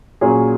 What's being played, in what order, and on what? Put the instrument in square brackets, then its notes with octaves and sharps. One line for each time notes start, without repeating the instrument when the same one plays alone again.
[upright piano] A#2 F#3 A#3 C#4 G#4